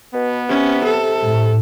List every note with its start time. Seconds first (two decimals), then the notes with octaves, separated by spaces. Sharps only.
0.14 B2 B3
0.49 C3 C#4
0.85 A4
1.23 A2